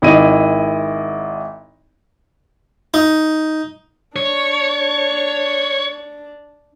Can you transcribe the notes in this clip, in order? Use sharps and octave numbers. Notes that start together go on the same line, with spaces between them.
G#1 E4 D#5 D#7
D#4
D4 C#5